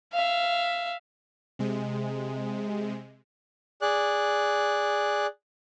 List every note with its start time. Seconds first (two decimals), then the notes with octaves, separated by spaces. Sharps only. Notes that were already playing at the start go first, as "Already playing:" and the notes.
0.13 E5 F5
1.59 C3 G#3
3.82 G#4 D5 F#6